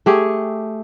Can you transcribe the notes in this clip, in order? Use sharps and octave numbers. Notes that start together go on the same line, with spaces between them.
A3 G4 G#4